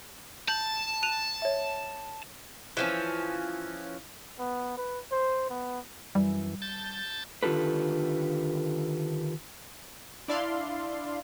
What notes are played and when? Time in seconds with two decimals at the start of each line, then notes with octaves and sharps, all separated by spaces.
0.48 A5 G6 F#7
1.03 F#6 D#7 F7
1.42 C#5 E5
2.77 E3 F3 C#4
4.39 B3
4.77 B4
5.12 C5
5.49 B3
6.15 F#2 E3 G3
6.62 A5 G6 A6
7.43 D3 D#3 F4 G4 A4 B4
10.28 D4 E4 D5 E5 F5 C6